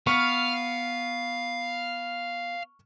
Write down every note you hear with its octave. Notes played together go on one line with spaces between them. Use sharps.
B3 F5 C#6 F6 C#7